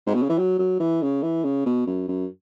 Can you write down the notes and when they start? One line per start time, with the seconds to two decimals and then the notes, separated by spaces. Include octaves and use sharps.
0.06 G#2
0.15 B2
0.22 C#3
0.29 E3
0.38 F#3
0.59 F#3
0.80 E3
1.02 C#3
1.22 E3
1.44 C#3
1.66 B2
1.87 F#2
2.08 F#2